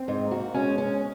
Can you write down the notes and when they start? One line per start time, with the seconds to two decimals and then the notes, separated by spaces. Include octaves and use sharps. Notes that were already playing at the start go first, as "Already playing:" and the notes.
Already playing: C4
0.08 G#2
0.24 A#3
0.31 F#4
0.54 G#3 C#4
0.78 C#4